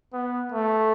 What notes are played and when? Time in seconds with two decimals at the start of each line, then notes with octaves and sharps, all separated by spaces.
0.13 B3
0.52 A3